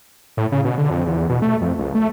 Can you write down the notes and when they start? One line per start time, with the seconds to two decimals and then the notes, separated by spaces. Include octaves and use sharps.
0.37 A2
0.52 C#3
0.65 B2
0.78 D3
0.90 F2
1.06 E2
1.29 B2
1.42 A3
1.61 F2
1.78 C#2
1.95 A3